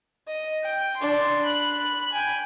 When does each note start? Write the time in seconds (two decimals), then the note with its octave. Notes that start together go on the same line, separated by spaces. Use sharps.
0.28 D#5
0.64 G5
0.97 D4 C6
1.43 B5 F#6
2.13 G5 G#5